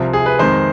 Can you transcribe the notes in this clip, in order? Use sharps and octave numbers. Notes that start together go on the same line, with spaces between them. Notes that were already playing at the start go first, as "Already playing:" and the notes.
Already playing: C2 C3 F3
G#4
B4
F2 D#3 G#3 C5